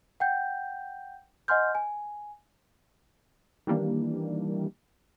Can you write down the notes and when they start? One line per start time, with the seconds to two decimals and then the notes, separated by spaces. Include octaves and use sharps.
0.20 F#5 G5 G6
1.48 D#5 F#5 G#5 C6 F6 G6
1.75 G#5
3.67 D#3 E3 G3 A#3 D4